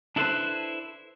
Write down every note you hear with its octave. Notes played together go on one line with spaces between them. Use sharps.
D4 E4 A4 B4 C5